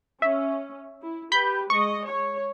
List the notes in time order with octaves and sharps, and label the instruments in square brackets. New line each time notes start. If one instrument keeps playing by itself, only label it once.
[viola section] C#4 [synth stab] E5
[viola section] E4
[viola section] G4 B4 [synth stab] B5 G6
[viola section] G#3 D#5 [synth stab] C#6
[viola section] C#5